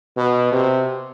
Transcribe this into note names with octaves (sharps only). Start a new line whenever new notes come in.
B2
C3